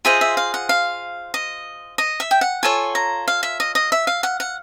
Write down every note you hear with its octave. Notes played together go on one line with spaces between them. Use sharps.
F4 G#4 C5 D#5 E5
E5
F5
F#5
F5
D#5
D#5
E5
G5
F#5
F4 A4 C#5 G#5
A#5
F5
E5
D#5
D#5
E5
F5
F#5
F#5